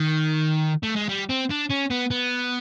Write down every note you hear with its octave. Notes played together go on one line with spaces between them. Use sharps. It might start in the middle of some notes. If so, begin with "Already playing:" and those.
Already playing: D#3
A3
G#3
G3
C4
D4
C#4
B3
B3